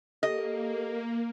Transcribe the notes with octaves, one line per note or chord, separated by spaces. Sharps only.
A#3 G4 A4 D#5